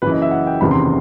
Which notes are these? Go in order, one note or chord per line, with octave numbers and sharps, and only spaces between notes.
F#1 F#2 E3 B4
D#5
E5
F#5
G5
F#1 E2 C3 D#3 B5
C6